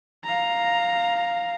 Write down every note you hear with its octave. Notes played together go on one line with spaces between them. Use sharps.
F5 A#5